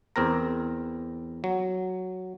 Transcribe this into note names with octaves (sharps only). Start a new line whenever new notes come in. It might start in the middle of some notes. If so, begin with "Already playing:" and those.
E2 C4 A#4 A#5
F#3